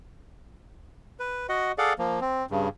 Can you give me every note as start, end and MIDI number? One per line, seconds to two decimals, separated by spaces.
1.20 1.47 71
1.49 1.72 66
1.49 1.72 75
1.49 1.72 78
1.78 1.93 68
1.78 1.93 69
1.78 1.93 74
1.78 1.93 77
1.78 1.93 78
1.98 2.20 53
1.98 2.20 58
2.21 2.46 60
2.51 2.69 43
2.51 2.69 49